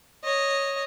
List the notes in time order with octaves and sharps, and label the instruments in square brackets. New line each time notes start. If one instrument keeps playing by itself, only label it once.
[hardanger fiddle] C#5 D#5